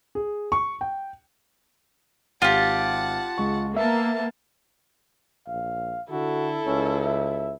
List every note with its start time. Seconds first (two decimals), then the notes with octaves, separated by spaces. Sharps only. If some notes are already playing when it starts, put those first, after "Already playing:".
0.15 G#4
0.52 C#6
0.81 G5
2.42 G#1 F4 G4 F#5 A5
3.38 C#2 G#3 C#6
3.76 A#3 B3 E5 A5
5.47 A#1 F5
6.10 D3 E4 F#4 A4
6.66 C#2 C#4
7.05 E5